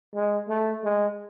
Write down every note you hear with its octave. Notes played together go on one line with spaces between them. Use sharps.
G#3
A3
G#3